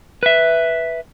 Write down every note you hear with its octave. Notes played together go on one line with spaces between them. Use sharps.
B4 E5